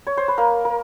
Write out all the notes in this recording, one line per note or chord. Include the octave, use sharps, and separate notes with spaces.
C#5
C5
B4
A#3 A#4
A#4